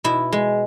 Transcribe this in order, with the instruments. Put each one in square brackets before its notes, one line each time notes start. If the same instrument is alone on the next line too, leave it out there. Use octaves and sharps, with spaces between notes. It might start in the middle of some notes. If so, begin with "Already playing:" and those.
[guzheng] B2 E4
G#3